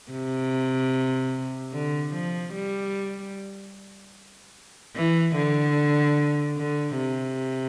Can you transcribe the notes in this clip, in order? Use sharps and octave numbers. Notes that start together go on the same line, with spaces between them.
C3
D3
F3
G3
E3
D3
D3
C3